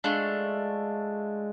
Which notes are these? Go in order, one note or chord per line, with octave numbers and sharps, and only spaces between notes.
G#3 A3 D4 F4